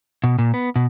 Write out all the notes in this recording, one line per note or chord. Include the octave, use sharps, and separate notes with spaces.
B2
A#2
B3
B2